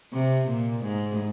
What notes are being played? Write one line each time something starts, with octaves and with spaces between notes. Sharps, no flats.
C3
A#2
G#2